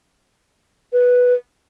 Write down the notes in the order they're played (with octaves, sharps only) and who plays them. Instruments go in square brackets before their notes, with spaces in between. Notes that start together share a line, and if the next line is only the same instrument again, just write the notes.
[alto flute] B4